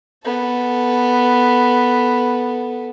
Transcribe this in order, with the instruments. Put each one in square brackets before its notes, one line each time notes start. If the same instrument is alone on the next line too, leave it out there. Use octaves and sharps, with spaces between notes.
[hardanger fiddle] B3 A4